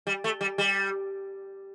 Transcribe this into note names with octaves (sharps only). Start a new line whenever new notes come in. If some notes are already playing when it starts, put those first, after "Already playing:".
G3
A3
G3
G3